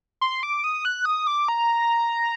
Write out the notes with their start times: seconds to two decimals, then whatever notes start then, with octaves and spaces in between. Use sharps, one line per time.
0.21 C6
0.43 D6
0.64 D#6
0.85 F#6
1.05 D#6
1.27 D6
1.48 A#5